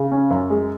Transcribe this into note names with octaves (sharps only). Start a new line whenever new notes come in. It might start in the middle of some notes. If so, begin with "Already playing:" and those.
Already playing: C#3
C#4
F#2
G#3